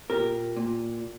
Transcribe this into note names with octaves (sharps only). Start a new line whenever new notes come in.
A#2 G4 A#4
A#2